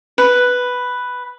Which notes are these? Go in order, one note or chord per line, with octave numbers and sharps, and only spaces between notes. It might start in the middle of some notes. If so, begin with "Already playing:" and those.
B4